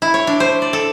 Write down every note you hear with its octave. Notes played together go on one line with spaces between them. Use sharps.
E4
C#5
D4
C5
D5
A4